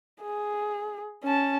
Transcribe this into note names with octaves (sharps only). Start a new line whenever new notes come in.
G#4
C#4 A5